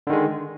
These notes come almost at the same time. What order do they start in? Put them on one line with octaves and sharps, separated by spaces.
D3 D#3 G#3